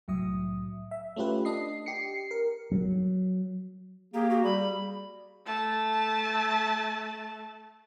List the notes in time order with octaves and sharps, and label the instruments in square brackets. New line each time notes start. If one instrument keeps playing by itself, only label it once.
[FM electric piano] C2 A2 F#3 E5 D#6
E5
A3 C#4 F4 G4 B4
D4 D#5 C7
G4 C7 C#7
A#4
[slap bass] F#3
[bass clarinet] A#3 [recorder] G4 [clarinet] G#4
[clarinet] F#4 [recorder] G4
[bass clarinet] G3 [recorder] B5
[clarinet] G#4
[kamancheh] A3 A5